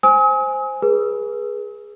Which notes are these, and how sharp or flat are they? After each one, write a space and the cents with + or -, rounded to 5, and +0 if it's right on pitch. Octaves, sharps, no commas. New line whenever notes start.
C5 +0 G#5 +0 D#6 +45
G#4 +0 B4 -35